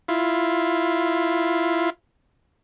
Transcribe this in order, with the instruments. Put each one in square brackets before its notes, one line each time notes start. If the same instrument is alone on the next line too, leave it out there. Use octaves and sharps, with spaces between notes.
[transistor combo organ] E4 F4